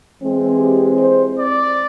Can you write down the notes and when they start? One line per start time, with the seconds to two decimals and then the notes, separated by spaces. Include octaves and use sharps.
0.21 E3 G#3 C4
0.59 G4
0.98 C5
1.36 D5